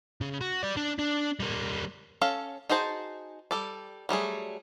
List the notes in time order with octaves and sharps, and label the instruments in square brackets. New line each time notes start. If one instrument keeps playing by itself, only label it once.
[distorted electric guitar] C#3
F#4
G4 D5
D4
D4
G3 A#3
[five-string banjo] C#4 A4 F5
D#4 F#4 G#4 C5 A5
G3 A4 D5
F#3 G3 A3 G#4